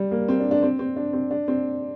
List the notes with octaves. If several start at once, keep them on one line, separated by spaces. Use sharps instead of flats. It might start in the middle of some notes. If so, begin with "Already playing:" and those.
Already playing: G3
A#3
C4
D4
D4
C4
C4
D4
C4
D4
C4